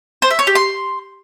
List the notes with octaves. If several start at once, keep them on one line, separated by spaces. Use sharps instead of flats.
C5
E5
C#5
G4
C6